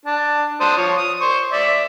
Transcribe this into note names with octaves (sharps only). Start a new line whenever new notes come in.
D4
D4 C5 D#6
F3 C#5
D#6
C5 C#6
D5 E5